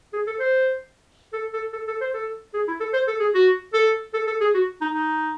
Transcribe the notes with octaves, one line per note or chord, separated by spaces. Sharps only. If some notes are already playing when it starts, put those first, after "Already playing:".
G#4
A4
C5
A4
A4
A4
A4
C5
A4
G#4
E4
A4
C5
A4
G#4
F#4
A4
A4
A4
G#4
F#4
D#4
D#4